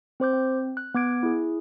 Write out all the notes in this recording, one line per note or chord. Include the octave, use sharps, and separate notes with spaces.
C4 C5 D6 G6
C4
F#6
B3 D6 G#6 D7
E4 G#4